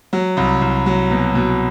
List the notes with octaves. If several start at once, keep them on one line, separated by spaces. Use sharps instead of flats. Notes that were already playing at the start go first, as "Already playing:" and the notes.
F#3
C2
C2
F#3
B2
B2